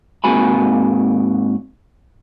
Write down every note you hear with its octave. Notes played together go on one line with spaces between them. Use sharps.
G#2 A#3 C4 F#4 G#5 B5